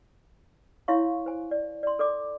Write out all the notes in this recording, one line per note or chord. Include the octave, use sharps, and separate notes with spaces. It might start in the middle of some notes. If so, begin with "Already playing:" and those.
E4 C#5 E5 F5 C6 C#6
C5 G#5
D5
D5 C6
A4 D5 D6